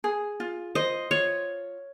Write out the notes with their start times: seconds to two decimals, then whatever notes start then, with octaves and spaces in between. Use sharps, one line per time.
0.04 G#4
0.40 F4
0.75 C5 D#5
1.11 F4 C#5